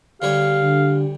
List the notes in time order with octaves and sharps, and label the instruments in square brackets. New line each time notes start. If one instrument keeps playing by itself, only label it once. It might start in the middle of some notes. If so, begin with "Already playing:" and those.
[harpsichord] D2 G3 C#5 [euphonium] G4 [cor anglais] F5
[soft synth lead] D3